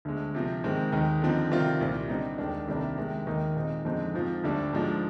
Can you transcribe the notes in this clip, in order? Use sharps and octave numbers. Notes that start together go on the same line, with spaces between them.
D2 D3 G#3
C3 F3 C4
G#2 D#3 G#3 C4
D#2 D#3 G#3 D#4
D3 F3 C4 D#4
C3 D#3 G3 C4 F4
C2 A#2 G3
D3 G3 C4 D#4
D#2 D#3 G#3 D4
C2 C3 D#3 A#3 D4
C3 D#3 G#3
D#2 D#3 A#3 D#4
A#2 G#3 C4 D#4
F2 D3 G#3 C4 D#4
G#2 F3 C4 F4
D2 D3 G3 D4
G#2 F3 G#3 D4